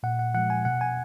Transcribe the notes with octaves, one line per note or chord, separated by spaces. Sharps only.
A#2 F#5
F#5
F3 G#3 F#5
G#5
B2 F#5
G#5